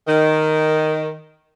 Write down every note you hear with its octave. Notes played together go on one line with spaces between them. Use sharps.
D#3